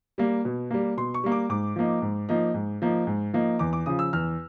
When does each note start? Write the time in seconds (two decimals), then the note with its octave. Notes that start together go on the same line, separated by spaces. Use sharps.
0.18 G3 A#3
0.45 B2
0.71 G3 A#3
0.97 B2 C6
1.14 C#6
1.24 G3 A#3
1.32 D6
1.49 G#2 D6
1.76 F3 A#3 D#4
2.02 G#2
2.29 F3 A#3 D#4
2.54 G#2
2.82 F3 A#3 D#4
3.07 G#2
3.33 F3 A#3 D#4
3.59 E2 D6
3.73 D6
3.86 C#3 F3 D#6
3.99 E6
4.13 E2 F6